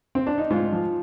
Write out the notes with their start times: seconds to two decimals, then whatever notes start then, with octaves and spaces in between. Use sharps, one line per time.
0.15 C4
0.27 D4
0.38 D#4
0.51 G#2 F4
0.72 F3